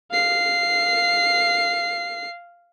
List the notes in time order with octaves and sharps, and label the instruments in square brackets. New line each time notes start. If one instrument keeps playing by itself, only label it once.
[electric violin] F5 C7